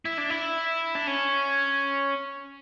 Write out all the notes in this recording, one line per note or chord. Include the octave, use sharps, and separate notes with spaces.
E4
D4
E4
D4
C#4